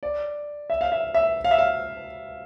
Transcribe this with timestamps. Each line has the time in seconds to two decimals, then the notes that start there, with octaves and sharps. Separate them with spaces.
0.03 D5
0.70 E5
0.81 F5
0.92 E5
1.14 E5
1.44 F5
1.51 E5
1.58 F5